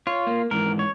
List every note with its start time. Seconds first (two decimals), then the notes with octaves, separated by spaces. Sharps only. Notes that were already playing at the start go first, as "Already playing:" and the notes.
0.07 F4 C#5
0.27 A#3
0.51 G#2 D#3 E3 A#4
0.79 C#5